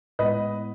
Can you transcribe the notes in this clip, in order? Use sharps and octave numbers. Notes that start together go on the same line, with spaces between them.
A2 G#3 B3 B4 D#5